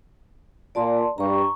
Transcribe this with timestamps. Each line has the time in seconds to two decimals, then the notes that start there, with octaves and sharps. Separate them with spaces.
0.75 A#2 D5 A5 C6
1.18 G2 A#5 C#6